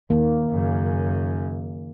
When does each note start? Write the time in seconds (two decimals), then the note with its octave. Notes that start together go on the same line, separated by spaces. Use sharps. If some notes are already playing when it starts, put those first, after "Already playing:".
0.10 D#2 D#3 A#3
0.50 F#2 C#3